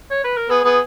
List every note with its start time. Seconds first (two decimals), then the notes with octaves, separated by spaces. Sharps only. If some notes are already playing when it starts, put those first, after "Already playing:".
0.11 C#5
0.24 B4
0.37 A#4
0.50 B3 G#4
0.64 B3 G#4